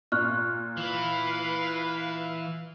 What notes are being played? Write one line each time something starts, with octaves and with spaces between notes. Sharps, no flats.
A#2 C#6 F6 F#6
E3 B4 F5